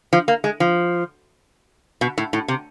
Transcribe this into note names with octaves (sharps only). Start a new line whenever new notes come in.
F3
A#3
G#3
F3
B2
A2
A2
C3